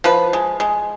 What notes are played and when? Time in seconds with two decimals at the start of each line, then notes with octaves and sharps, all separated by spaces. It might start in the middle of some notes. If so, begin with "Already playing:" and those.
0.04 F3 B4
0.33 G#3
0.60 G#3